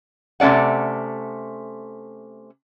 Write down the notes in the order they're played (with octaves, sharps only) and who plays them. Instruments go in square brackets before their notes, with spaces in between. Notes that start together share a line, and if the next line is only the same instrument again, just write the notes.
[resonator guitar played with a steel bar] C3 A3 C#4 D5 F#5